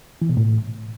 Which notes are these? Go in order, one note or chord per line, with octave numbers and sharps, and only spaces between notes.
E3
B2
A2